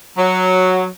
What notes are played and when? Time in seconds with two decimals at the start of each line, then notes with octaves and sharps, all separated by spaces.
0.18 F#3